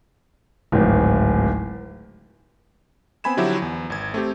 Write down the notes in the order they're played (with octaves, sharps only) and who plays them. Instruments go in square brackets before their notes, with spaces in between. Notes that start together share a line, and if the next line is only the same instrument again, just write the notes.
[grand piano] D1 G#1
[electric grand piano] B3 C4 G#5 B5 G#6 E7
D3 F3 F#3 E4 F#4 G4
E2
G#1 G#6
A3 C4 G4